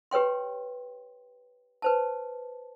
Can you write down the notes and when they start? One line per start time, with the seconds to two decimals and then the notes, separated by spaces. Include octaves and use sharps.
0.11 G4 B4 C#5 G5 C6
1.82 B4 C5 A5